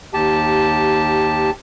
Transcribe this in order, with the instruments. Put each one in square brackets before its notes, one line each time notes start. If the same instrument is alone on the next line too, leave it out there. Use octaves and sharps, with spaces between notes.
[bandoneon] D#2 G4 A5